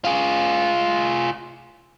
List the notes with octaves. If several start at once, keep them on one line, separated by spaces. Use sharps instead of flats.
F4 G#4